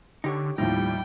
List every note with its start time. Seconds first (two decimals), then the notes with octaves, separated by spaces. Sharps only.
0.24 D3 D#4 G4 C#5
0.58 D#2 A2 F3 G3 D#4 G5